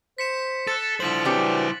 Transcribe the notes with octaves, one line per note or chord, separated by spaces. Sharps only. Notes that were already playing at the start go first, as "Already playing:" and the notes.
C5 B6 C#7 E7
A4 F#6 A6
D3 F3 E4 C5 B6 F#7
E3 F#3 C4 D4 G4